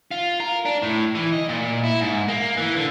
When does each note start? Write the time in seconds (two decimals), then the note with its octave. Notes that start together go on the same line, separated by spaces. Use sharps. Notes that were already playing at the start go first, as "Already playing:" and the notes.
0.11 F4
0.40 A#4
0.65 D4
0.82 A2
1.15 E3
1.33 D#5
1.49 A#2
1.84 E4
2.00 G#2
2.28 A#3
2.57 E3
2.76 D3